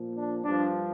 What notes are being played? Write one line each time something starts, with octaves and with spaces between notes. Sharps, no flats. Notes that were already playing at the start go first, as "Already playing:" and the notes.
Already playing: A#2 F3
D4
G2 F3 D4